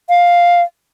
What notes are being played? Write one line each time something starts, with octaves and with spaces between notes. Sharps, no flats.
F5